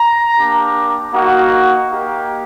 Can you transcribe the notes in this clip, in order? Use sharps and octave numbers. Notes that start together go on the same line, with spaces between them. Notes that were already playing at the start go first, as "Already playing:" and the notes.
Already playing: A#5
A#3 D4 G4
A#3 D#4 F#4
A#3 D#4 G4